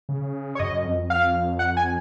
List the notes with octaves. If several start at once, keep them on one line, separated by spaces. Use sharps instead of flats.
C#3
C#5
F#2 D#5
F2
F5
F#5
G#5